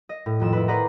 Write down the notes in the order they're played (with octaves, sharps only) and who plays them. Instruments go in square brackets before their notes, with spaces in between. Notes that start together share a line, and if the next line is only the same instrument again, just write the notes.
[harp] D#5
A2
D#1 F2 E7
E4 B4
B4 C5 D5 D#5 F#5 A#5